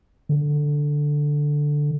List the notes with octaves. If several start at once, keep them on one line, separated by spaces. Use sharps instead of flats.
D3